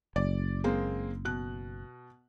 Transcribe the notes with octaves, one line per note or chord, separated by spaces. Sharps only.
F#1 D5
G#3 A#3 C4
B2 F#6